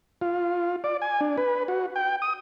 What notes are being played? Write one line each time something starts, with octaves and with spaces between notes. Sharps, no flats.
F4
D5
G#5
D4
B4
F#4
G5
D#6